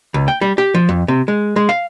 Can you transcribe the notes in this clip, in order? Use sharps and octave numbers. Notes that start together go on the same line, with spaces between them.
C#2
G5
G3
G4
F3
F2
C3
G#3
G#3
F5